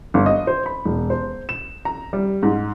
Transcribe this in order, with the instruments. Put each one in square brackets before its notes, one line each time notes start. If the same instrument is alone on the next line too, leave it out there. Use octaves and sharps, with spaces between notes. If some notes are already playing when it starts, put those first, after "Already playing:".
[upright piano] G1
D#5
C5
B5
E1
C5
E7
A#5
G3
G#2